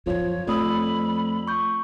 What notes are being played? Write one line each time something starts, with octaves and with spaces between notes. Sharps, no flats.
F#2 E3 F3 C#5
F2 A3 D5 B5 D#6 E6
C#6 G6